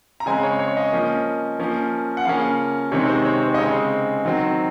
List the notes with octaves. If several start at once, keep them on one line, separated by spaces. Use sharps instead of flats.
A#5
C#3 G#3 C4 G#5
C#5
C#5
D#5
F3 A#3 C#4
F3 A#3 C#4
F#5
C#3 F3 A#3 C#4 F5
C3 D#3 G#3 C4 C#5
C5
C#5
C5
D#5
C#3 G#3 C4 C#5
D#3 F#3 C4